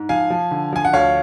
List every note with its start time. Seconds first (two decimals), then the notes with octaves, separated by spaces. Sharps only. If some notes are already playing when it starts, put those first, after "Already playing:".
Already playing: G#2
0.09 F3 F5 G#5
0.30 F3
0.51 D3
0.73 F3 G#5
0.85 F#5
0.93 D2 C#5 F5